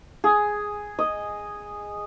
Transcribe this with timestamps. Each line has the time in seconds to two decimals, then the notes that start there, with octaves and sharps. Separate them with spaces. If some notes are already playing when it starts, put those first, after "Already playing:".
0.24 G#4
0.99 D#5